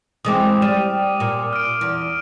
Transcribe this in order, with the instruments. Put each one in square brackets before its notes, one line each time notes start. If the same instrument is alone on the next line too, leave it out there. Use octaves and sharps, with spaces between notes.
[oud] E3 G#3 C4 [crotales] D6 D#6
[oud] G3 [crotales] F6 D#7 E7
[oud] A#2
[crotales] F6 D7
[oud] E2